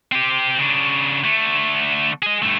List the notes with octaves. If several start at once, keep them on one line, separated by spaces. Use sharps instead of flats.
C4 G4
C#3 D4
D3 A3
G#4 D#5
G2 A3